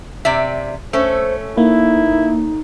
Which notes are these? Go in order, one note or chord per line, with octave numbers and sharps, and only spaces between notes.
C3 D5 E5
A3 C#4 C5
A#3 D#4 E4